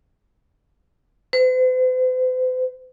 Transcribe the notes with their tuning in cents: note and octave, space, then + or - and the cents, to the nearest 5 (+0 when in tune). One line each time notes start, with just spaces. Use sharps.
C5 -45